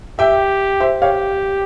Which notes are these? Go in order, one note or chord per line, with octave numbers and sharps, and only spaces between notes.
G4 E5 G5
C5 E5
G4 C#5 F5